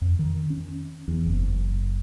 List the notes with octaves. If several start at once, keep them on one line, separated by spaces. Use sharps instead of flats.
F2
D#3
C#4
E2
F#1